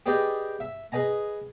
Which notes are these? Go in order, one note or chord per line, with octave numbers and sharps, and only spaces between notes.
G4 G#4 B4 D5 D#5 G5
E5
G#4 B4 D#5 G#5 A#5